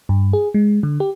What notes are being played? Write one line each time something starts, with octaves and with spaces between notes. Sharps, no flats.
G2
G#4
G#3
D3
G4